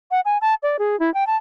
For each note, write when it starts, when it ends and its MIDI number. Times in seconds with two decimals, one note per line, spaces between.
0.11 0.20 78
0.25 0.38 80
0.41 0.54 81
0.63 0.77 74
0.79 0.98 68
0.99 1.12 64
1.14 1.26 79
1.27 1.36 81